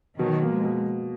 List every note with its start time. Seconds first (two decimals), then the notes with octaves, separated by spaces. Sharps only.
0.19 B2 D#3 F#3
0.42 A#3
0.48 F3 G#3
0.64 B2